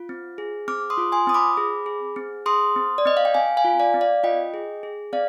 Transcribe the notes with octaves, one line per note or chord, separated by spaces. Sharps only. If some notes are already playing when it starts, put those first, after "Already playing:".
Already playing: F4
C4
G#4
C4 D6 F6
C6 D#6
F4
G#5 C6
C4 D#6
B5 D6
G#4
G#4
C4
G#4 C6 D#6
C4
D5
C4 D#5
F5
G5
C4 F5 G#5
F5 G#5
F4
D5 F5
C4
D5 F5
F4 D#5 G5
G#4
G#4
C4 D5 F5